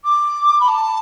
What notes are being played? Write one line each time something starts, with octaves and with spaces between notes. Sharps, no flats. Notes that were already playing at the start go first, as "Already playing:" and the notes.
D6
B5
A5